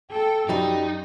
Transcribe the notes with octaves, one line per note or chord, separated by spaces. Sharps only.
A4 G5
F#2 F#3 G3 D#4